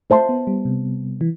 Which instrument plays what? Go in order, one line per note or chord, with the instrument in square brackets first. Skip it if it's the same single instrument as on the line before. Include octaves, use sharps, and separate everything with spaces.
[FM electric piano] A3 [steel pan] C5 E5 A5 C6
[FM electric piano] B3
G3
C3
E3